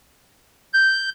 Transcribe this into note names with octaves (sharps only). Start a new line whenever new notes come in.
G6